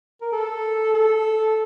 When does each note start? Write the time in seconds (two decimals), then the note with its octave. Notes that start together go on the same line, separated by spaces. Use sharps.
0.21 A#4
0.32 A4
0.94 A4